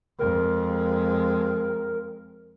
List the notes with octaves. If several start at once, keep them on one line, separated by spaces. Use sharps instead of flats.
F2 G#3 A#4